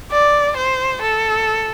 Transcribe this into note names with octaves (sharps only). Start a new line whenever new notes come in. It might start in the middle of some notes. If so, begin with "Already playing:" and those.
D5
C5
A4